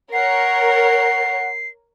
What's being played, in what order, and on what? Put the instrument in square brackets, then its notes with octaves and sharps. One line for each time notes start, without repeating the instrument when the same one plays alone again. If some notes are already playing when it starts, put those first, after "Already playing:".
[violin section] A#4 C#5 [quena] F#5 [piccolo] C7